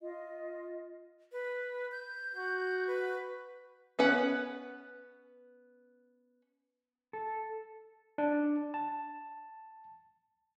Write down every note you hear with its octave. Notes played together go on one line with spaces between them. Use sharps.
F4 D#5
B4
G6
F#4
B4
B3 C#4 B4 F#5
A4
D4
A5